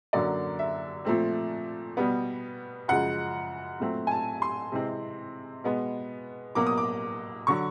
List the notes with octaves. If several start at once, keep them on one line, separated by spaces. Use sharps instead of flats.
F#2 D3 F#3 A#3 D5
E5
A#2 F3 A3 C4
B2 G3 B3
F#2 C#3 F3 G#3 F#5
A#2 F#3 A3 C4
G#5
A5
C6
C3 E3 G#3 C4
B2 G#3 B3
B2 F#3 A#3 D6
D#6
D6
D3 F#3 C#6